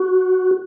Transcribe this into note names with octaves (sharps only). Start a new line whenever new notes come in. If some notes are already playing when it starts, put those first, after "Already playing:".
Already playing: F#4